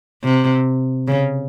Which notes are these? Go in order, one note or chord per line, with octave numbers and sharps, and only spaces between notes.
C3
C#3